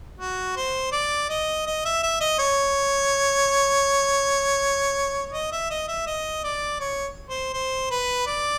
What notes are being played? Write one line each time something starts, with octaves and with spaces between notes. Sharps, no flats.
F#4
C5
D5
D#5
D#5
E5
E5
D#5
C#5
D#5
E5
D#5
E5
D#5
D5
C#5
C5
C5
B4
D5